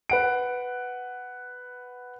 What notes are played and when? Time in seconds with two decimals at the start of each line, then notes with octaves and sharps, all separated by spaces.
0.10 B4 F#5 D7